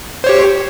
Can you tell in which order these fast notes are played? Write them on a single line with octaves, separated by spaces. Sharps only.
C5 C#5 G4